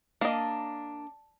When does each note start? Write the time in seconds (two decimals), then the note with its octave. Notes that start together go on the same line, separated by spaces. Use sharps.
0.21 A#3 D4 D#5